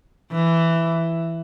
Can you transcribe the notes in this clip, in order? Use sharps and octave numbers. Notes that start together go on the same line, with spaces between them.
E3